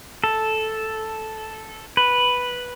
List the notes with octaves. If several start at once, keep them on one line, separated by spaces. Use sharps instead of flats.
A4
B4